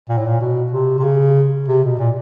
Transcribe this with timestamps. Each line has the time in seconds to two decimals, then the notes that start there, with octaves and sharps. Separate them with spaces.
0.09 A#2
0.17 A2
0.27 A#2
0.41 B2
0.72 C3
0.98 C3
1.03 C#3
1.68 C3
1.84 B2
1.99 A#2